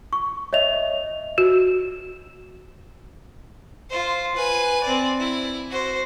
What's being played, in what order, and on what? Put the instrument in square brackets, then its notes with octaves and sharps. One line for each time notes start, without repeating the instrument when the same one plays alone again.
[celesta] C#6
C#5 D#5 E5 F7
[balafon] F#4
[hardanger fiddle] F4 C5
B4 G#5
C4 D5
E4
F#4 C5